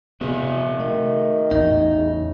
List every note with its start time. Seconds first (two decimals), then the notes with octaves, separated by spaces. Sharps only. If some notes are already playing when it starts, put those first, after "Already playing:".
0.21 E2 C3 B3 F#4 G#4 E5
0.79 D#3 A3
1.51 A1 E2 D#4
1.97 C#3